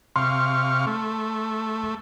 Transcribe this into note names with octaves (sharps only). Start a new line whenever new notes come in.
C3 F5 C6 C#6
A3